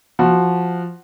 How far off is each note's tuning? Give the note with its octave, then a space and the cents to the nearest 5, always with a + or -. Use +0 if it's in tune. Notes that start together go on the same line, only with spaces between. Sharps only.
F3 +0 F#4 +0